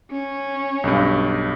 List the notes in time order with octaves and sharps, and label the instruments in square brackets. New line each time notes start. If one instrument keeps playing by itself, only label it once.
[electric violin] C#4
[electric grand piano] B1 G2